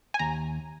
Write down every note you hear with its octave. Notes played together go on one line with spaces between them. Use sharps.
G#5
D#2 A#5